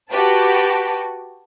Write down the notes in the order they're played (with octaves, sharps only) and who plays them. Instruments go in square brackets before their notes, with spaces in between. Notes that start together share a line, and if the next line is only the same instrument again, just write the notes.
[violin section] F#4 G4 B4 G5 A5